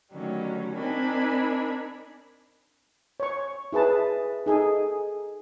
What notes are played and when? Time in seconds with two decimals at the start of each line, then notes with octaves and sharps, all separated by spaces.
0.12 D3 D#3 F#3 G3 A3 C#4
0.75 C4 D4 D#4 A#4 G#5 B5
3.20 C#5 C#6
3.72 E4 G#4 B4 A5
4.46 D#4 G#4 A4